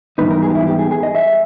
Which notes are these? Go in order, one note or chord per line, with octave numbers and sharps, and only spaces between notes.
G#2 E3 G3 B3 D#4 B4
A#4
G#4
G4
E4
G4
G#4
G#4
D#5
E5